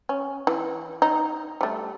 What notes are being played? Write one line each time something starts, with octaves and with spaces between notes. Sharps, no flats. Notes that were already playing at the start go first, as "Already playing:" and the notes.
C#4
E3
D#4
G3 A3